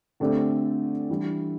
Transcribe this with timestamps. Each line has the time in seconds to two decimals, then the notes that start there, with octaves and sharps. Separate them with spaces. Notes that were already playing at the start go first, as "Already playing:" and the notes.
0.20 D3 A3 C4 G4 D5
1.09 E3 G3 D4